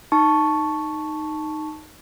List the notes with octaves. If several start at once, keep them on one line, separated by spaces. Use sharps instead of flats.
D#4 A5 C#6